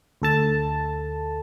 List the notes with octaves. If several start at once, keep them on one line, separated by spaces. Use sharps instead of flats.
D2 A4 A5